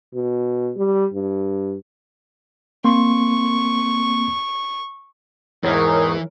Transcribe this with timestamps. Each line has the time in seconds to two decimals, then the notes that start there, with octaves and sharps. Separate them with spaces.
0.14 B2
0.76 G3
1.14 G2
2.84 A#3 C4 C6 C#6
5.64 E2 G#2 E3 C4 D#4 G#4 A#4 C#5